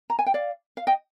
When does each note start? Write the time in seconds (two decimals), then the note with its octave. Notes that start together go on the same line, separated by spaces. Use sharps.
0.10 A#5
0.19 G#5
0.26 G5
0.34 D5 F5
0.77 F5
0.87 D#5 G5